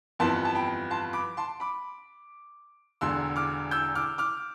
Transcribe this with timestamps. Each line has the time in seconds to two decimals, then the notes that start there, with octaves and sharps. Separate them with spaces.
0.19 G1 F2 E3 B3 A5 C6
0.45 A5
0.55 G5 B5
0.90 A5 C6
1.13 B5 D6
1.37 A5 C6
1.60 B5 D6
3.01 E1 E2 D3 C6 E6
3.36 D6 F6
3.71 E6 G6
3.95 D6 F6
4.18 D6 F6